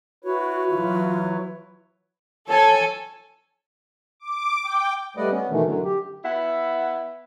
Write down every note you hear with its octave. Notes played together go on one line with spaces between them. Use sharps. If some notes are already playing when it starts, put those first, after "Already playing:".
E4 F#4 B4 C#5
E3 F#3 F4
A4 C#5 G#5
D6
G5
G3 A3 B4 D5 D#5 F#5
B3 C#4
B2 D#3 E3 A3
F#2 D3 F#3
G4
B3 E4 E5 F#5